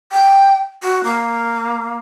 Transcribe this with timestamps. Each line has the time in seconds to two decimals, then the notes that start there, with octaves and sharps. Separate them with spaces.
0.12 G5
0.82 F#4
1.04 A#3